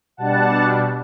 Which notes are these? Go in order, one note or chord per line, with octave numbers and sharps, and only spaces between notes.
B2 G3 D4 F#5 A5